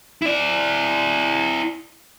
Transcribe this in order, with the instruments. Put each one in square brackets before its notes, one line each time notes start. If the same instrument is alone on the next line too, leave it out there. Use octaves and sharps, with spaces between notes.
[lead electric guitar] E4 D5